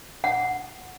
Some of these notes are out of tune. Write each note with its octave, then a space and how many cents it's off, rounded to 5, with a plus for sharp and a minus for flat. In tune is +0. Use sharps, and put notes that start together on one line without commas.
F#5 -5